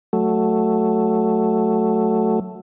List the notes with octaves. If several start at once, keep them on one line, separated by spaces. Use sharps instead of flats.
F#3 A3